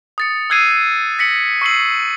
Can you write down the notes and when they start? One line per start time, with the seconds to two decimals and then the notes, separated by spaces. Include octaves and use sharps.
0.18 D#6 A6 C#7
0.50 E6 F#6 G#6 C7 D#7
1.19 A#6 B6 C#7 F#7
1.61 C#6 E6 C7 F#7